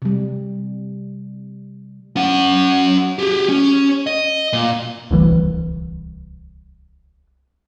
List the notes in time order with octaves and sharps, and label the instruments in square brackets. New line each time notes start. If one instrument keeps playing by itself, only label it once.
[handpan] C3 G3
[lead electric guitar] C#4 F#5
G4 G#4
C#4
D#5
A#2
[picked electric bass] D1 C2 E3 G3